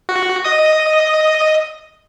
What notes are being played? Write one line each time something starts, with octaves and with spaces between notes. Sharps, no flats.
F#4
D#5 D#6